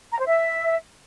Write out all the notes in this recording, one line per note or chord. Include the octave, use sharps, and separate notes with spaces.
A#5
C5
E5